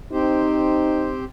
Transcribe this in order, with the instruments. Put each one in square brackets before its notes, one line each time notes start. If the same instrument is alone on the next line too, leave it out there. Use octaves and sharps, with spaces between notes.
[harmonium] C4 G4 C5 [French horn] D#4